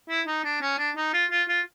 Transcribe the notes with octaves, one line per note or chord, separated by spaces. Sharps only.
E4
D#4
D4
C#4
D4
D#4
F4
F4
F4